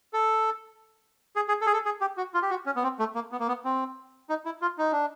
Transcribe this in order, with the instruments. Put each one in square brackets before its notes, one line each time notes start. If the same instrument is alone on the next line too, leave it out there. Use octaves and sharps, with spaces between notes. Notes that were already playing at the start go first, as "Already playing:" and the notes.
[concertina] A4
G#4
G#4
A4
G#4
A4
G#4
G4
F#4
F4
G4
F#4
C#4
B3
C4
A3
A#3
B3
A#3
B3
C4
D#4
E4
F4
D#4
D4